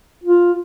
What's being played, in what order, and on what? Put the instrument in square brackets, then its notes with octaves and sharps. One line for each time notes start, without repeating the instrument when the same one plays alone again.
[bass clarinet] F4